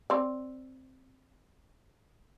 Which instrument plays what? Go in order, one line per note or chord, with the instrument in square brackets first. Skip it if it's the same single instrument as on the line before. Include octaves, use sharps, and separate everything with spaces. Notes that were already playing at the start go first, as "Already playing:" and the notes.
[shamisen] C4 D5